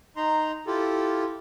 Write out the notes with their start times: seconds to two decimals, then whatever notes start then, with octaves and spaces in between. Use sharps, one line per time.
0.17 D#4 A#5 C6
0.67 E4 F4 G4 A4